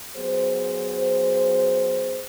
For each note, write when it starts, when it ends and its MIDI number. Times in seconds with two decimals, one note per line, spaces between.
0.16 2.27 54
0.16 2.27 59
0.16 2.27 68
0.16 2.27 72